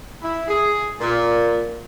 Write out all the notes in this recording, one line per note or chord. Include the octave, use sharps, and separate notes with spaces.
E4
G#4
A#2